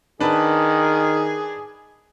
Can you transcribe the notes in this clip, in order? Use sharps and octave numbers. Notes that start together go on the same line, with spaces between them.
D#3 D4 G#4 B4